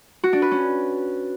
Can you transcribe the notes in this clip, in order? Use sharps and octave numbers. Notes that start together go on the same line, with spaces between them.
F#4
D4
B4
C#4